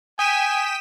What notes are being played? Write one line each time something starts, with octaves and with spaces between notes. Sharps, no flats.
G5 G#5 D#6 B6 D#7 E7